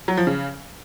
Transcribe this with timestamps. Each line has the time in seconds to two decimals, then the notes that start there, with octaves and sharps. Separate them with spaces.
0.08 F#3
0.17 F3
0.27 C#3